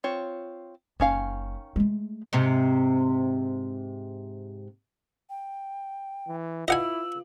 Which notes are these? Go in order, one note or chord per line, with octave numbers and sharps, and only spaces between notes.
C4 F4 C#5
F#1 D#3 C#4 F5
G#3 A3
G#2 C3
G5
E3
E4 F4 D#5 F5 F#5 G#5 E6 F#7